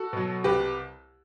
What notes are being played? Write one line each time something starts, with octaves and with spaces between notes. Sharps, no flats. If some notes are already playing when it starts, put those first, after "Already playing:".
Already playing: F#4 A4
B2 F#3
C2 G4 B4